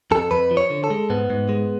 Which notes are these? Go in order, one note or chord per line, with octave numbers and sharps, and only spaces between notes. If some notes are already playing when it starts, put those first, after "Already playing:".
F2 A4
F2 B4
F3
C#5
D3
A4
G#3
G#2 B3
G#2
G#3